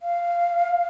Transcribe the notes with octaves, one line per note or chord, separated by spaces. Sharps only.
F5